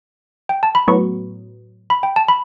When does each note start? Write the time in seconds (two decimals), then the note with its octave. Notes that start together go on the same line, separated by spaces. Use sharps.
0.49 G5
0.63 A5
0.75 B5
0.88 A2 F#3 B3 C#6
1.90 B5
2.03 G5
2.16 A5
2.28 B5